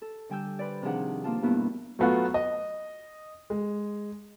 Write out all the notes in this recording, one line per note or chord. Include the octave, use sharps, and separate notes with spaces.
A4
D3 G3 G5 G#5 E6 G6
B4 C5 D5
C3 D#3 F3 D4 G#4 F#5
A#3 D4 F4 A5
G2 B2 A#3 B3 E4
F#3 A3 B3 F4 F#4
D#5
G#3